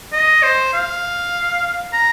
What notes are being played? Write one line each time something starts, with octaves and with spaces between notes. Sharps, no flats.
D#5
C5
F5
A#5